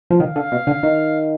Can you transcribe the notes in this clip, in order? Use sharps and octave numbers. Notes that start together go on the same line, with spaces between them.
F3
D#3 F5
D3
B2
D3
D#3